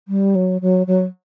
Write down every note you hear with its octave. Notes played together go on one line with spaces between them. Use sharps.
G3
F#3
F#3
F#3